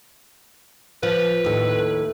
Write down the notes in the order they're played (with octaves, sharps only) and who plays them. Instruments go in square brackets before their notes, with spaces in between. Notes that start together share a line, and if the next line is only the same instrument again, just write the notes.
[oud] F3 [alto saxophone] B4
[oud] D#2 A2